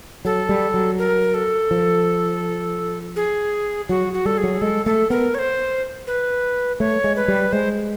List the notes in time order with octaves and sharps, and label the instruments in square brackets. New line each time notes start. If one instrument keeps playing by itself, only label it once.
[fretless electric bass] F#3 [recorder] A4
[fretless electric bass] G3
F#3
[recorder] A#4
A4
[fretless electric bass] F3
[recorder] G#4
[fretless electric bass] F#3 [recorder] F#4
[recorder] F#4
[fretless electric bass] G3 [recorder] A4
[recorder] G#4
[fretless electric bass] F#3
[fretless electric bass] G#3 [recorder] A4
[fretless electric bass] A3 [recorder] A4
[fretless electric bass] B3 [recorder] A#4
[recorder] C#5
C5
B4
[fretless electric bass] A3 [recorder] C#5
[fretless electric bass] G#3
[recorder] B4
[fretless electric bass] G3
[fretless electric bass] G#3 [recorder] C5